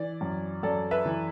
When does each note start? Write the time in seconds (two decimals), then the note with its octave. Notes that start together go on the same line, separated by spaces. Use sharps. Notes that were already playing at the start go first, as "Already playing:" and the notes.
Already playing: E3 D5
0.21 F#2
0.63 F#2 A4 D5
0.91 B4 E5
1.06 E3